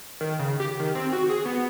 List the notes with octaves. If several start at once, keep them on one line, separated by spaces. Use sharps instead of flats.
D#3
C#3
G4
D#3
C4
F#4
G#4
B3